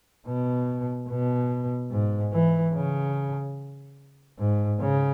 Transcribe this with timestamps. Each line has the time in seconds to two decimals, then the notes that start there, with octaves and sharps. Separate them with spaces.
0.27 B2
1.09 B2
1.91 G#2
2.33 E3
2.74 C#3
4.39 G#2
4.81 C#3